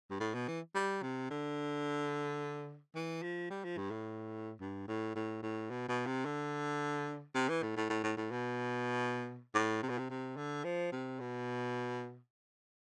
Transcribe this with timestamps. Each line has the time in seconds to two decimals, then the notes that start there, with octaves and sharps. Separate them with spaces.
0.10 G2
0.20 A2
0.34 B2
0.48 E3
0.75 G3
1.02 C3
1.30 D3
2.95 E3
3.22 F3
3.50 G3
3.64 F3
3.77 G2
3.91 A2
4.60 G2
4.88 A2
5.15 A2
5.43 A2
5.70 B2
5.88 B2
6.06 C3
6.25 D3
7.35 C3
7.49 E3
7.62 A2
7.76 A2
7.90 A2
8.03 A2
8.17 A2
8.31 B2
9.54 A2
9.83 C3
9.89 B2
9.98 C3
10.10 C3
10.37 D3
10.64 F3
10.92 C3
11.20 B2